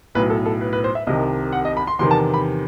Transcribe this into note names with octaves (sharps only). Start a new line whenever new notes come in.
B1 A2 F#3 B4
A4
A4
B4
B4
C5
E5
C2 C3 D#3 D#5
F#5
D#5
B5
C6
E2 C3 D#3 C6
A5
B5